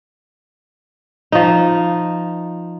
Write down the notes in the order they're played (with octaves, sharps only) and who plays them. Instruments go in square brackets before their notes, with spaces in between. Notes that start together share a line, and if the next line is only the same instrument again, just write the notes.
[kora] F3 D#4